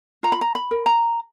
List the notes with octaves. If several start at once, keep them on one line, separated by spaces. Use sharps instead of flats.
F4 A#5
B5
A#5
B5
A#4
A#5